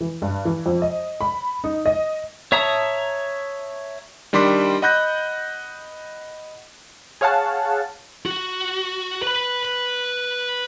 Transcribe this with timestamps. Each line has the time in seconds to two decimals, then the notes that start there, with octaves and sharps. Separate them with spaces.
0.01 E3
0.22 G2
0.45 E3
0.66 F2
0.82 D#5
1.21 B5
1.64 D#4
1.86 D#5
2.52 C#5 E5 A5 A#5 D#6
4.33 D#3 G3 D4 C6 D6 B6
4.82 D#5 F#5 B5 F#6 G6 A#6
7.21 G#4 C#5 F5 F#5 A5
8.26 F#4
9.22 B4 B5